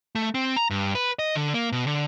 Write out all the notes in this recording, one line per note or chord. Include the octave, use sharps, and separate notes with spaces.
A3
C4
A#5
G2
B4
D#5
D3
A#3
B2
D3